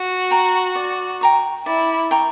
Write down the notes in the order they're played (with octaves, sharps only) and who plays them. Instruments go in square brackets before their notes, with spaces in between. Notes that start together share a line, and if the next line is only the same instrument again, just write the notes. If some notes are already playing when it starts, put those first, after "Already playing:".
Already playing: [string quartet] F#4
[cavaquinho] G5 A#5 C#6
D5
G5 A#5 C#6
[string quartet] E4 [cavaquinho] D5
[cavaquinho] G5 A#5 C#6